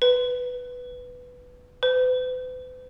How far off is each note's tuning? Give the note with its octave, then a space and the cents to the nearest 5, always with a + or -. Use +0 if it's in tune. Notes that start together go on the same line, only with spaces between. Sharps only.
B4 +5
B4 +45